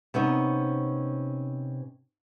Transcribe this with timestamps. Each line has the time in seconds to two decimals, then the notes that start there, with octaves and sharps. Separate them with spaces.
0.14 C3 B3 C#4 D#4